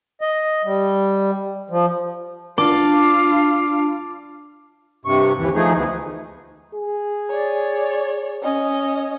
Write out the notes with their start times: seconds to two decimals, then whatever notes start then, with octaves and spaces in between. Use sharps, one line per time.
0.21 D#5
0.64 G3
1.70 F3
2.58 D4 F4 D5 F5 A5
5.05 G2 C3 C#6
5.39 D#2 E3
5.55 F3 A3 D#4 G#4
5.75 D2 B2 E3
6.75 G#4
7.30 C#5 D5
8.43 C#4 D#5